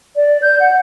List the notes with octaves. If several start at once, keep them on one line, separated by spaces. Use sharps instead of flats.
D5
G6
F#5